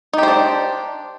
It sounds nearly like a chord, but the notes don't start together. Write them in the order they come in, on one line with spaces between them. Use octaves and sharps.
D#4 G4 C5 D4